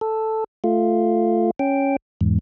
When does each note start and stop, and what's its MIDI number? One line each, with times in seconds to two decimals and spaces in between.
0.01 0.44 69
0.64 1.51 57
0.64 1.51 65
1.59 1.96 61
1.59 1.96 79
2.21 2.39 40
2.21 2.39 44